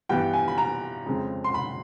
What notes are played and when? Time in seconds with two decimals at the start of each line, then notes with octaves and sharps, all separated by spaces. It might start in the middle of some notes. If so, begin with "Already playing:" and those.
0.09 G2 E3 G3 B3 G5
0.33 G#5
0.48 B5
0.58 A#5
1.06 F2 C#3 F3 G#3 C4
1.44 C6
1.54 B5